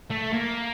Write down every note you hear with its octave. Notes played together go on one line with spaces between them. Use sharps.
A3
A#3